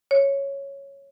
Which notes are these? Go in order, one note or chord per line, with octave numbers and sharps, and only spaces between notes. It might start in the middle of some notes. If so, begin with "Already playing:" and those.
C#5